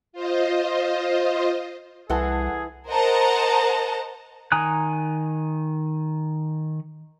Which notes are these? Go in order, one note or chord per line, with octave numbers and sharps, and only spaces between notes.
F4 C5 D#5
C2 E3 G#4 A4 F#5 G#5 A5 C6
A#4 C5 D#5 F#5 A5 A#5
D#3 G#5 A#5 D#6 F#6